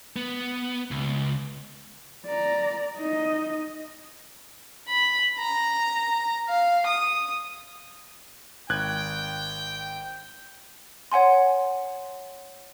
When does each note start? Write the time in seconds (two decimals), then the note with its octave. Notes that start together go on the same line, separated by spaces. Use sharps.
0.16 B3
0.91 C#2
2.26 D5 A#5
2.98 D#4 D#5
4.88 B5
5.39 A#5
6.48 F5
6.86 D#6
8.69 G#1 G5 F#6 G#6
11.12 C#5 F#5 G#5 C6